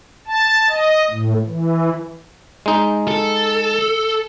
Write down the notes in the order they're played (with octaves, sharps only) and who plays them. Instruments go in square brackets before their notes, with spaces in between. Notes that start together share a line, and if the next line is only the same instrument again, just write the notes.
[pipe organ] A5
D#5
A2
E3
[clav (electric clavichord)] G#3 D#4
[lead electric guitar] A4